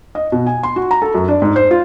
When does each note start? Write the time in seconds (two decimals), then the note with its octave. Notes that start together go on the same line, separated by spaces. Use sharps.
0.15 D#5
0.32 B2
0.46 G#5
0.63 C6
0.76 F#4
0.91 A#5
1.02 A4
1.14 F#2
1.28 D4
1.42 G#2
1.56 C5
1.71 F4